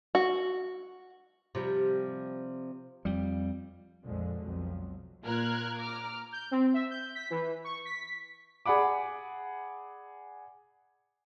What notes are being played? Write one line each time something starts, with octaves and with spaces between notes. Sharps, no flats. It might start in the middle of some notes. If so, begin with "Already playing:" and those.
F#4
C3 F3 G3
F2 G3
A#1 F2 D3 F3 G#3
B1 F2 F#3
A#2 F4 A#4 F6 F#6 G#6
A#5 D6 F6
G6
C4
E5
G6
B6
E3
C#6
B6
G#4 D5 F#5 B5 D6